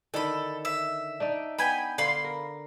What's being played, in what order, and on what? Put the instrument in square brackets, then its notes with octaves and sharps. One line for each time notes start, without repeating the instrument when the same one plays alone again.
[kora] D3 D#3 E4 [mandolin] A4 B5
[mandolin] E5
[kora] D4 D#4 D5
[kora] B3 [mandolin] G5 G#5 B5
[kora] D3 [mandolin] F5 B5 C6
[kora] A#4